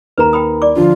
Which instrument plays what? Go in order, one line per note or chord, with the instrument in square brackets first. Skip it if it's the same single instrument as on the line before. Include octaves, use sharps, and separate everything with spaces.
[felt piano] D#2 A#4 [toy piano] B4 A#5
[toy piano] G5 B5 D#6
D5 D6
[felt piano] D3 F3 [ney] F4